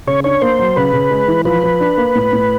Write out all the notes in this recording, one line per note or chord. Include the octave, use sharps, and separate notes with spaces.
C#3 C#5
D4 C#5
A#3 C5
F#3
C#3 B4
C#3
G#3
E3
F3 B4
F3
D4
A#3
A2
A2